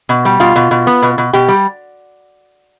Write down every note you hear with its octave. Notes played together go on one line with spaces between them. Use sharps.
B2
G3
B2 F4
B2
B2
B3
B2
B2
B2 G4
G3